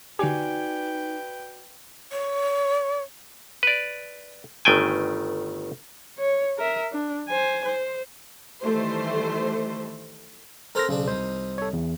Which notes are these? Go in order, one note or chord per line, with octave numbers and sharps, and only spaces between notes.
D3 D#4 F#4 G4 B4 D5 G5 G#5
C#5
B4 D5
G1 D#3 A3 G5 G#5
C#5
A#4 E5
D4
C5 G#5
C5
D#3 E3 G3 A3 C5
C4 A4 A#4 C5 F6 A#6
B1 C#3 C4 D4
C2 D#3 C5
A4 C#5
E2